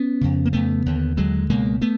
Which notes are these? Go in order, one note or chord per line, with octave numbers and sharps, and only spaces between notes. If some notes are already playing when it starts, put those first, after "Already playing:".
Already playing: B3 C#4
F2 C#3
A#3
F2 C#3 A3 B3
D#2 D3
D#2 D3 F#3 G#3
C#2 B2 G#3 A#3
A3 B3